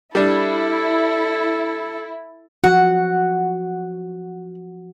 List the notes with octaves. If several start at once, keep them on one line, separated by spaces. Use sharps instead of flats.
G3 D4 E4 A4
F3 F#4 F#5